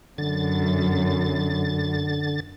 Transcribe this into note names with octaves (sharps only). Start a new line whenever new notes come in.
F#2 D3 A6